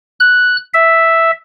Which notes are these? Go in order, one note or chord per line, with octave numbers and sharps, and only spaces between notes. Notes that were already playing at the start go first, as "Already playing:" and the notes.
F#6
E5